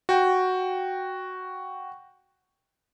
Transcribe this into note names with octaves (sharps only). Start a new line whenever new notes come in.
F#4 G5